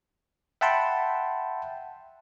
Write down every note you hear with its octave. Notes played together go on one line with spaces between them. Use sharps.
E5 F#5 G5 A5 B5 C6